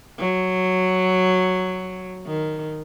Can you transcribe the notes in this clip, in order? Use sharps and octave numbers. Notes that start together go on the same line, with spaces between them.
F#3
D#3